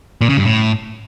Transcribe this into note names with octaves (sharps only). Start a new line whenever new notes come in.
A#2
C#3
G2
A2